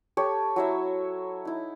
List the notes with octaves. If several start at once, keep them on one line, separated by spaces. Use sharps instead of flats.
G4 A4 C#5
F#3 E4 E5
D#4 E4